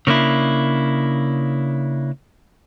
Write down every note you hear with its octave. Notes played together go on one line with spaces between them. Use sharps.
C#3 A#3 D4 E4